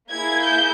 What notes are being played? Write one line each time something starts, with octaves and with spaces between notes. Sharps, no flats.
A#3 E4 G#4 G#6
G6